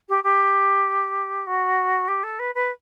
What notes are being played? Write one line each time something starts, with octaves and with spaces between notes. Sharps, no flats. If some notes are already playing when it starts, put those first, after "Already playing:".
G4
G4
F#4
G4
A4
B4
B4